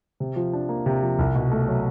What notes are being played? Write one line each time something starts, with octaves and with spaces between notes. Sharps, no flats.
C3
F3
D4
A#3
C3
F3
C2
B2
A3
F#3